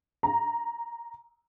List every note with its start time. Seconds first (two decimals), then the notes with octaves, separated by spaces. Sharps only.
0.23 A#5